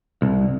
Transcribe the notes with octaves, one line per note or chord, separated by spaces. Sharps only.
C2